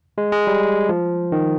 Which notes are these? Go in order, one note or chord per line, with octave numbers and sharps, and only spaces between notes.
G#3
G#3
G3
F3
D#3